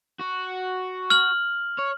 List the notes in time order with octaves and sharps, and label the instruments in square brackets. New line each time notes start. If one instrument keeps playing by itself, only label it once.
[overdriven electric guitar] F#4
[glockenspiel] F6 F#7
[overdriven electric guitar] C#5